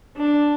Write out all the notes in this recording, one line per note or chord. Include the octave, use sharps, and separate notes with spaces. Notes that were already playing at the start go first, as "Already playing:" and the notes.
D4